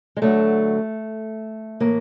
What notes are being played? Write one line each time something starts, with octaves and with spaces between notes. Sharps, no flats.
G#3
D2 D3 F#3 A3
A2 E3 A#3